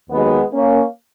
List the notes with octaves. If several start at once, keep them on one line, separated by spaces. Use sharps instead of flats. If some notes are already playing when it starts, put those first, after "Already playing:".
D#2 D#3 F#3 G#3 B3
A#3 C#4